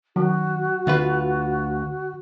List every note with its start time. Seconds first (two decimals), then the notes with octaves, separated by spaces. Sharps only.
0.16 D#3 F#3 F#4
0.87 D2 D3 F4 B4